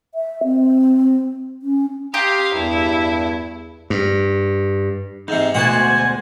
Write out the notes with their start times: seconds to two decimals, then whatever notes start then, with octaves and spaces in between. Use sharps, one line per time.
0.15 E5
0.44 C4
1.62 C#4
2.14 G4 F5 A#5 C6 D#6
2.54 E2 G2 E4
3.90 G2
5.28 G#2 C3 D#4
5.54 D2 B2 G#3 F#4 C5 D5 G#5 A5